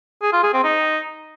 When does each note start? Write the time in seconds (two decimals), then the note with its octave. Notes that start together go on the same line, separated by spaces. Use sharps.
0.22 G#4
0.33 F4
0.43 G#4
0.53 C4
0.64 D#4